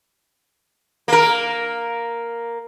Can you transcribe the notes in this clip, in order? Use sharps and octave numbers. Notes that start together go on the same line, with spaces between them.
A#3 A#4